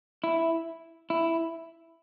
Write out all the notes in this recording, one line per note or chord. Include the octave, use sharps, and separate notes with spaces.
E4
E4